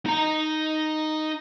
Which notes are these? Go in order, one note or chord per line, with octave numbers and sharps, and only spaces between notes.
D#4 A#5